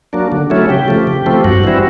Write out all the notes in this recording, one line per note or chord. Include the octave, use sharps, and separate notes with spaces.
F#3 A#3 D4
D3
F#3 A3 C#4 E4
C#3 G4
F3 A3
C#3
F3 A3 C4
G2 F#4
E3 G3 C4 E4